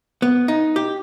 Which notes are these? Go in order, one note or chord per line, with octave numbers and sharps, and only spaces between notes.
B3
D#4
G4